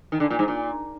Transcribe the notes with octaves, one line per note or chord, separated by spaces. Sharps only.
D#3
D3
A#2
G#2
A#2